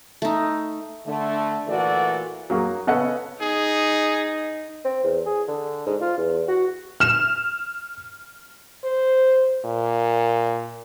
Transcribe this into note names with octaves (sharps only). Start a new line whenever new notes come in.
A3 D#4
D3 A3
A#2 E3 A3 F#4 A4 D5
F#3 A#3 F#4 G#4
C#3 B3 C#4 A4 D#5 F#5
D#4 G#4
C4
E2
G#4
D3
G#2
F4
E2
F#4
F6 E7
C5
A#2